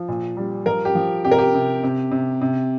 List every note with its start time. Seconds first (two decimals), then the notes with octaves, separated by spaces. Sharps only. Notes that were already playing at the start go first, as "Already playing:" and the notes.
Already playing: F3
0.08 A#2
0.37 G3
0.66 F3 A#4
0.85 G4
0.95 F3
1.25 C3 G4
1.31 A#4
1.38 G4
1.54 C3
1.83 C3
2.11 C3
2.41 C3